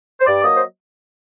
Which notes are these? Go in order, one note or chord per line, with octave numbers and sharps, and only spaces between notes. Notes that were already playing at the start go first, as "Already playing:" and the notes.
C5
G2 D5
F#3 A#3 D#5
C5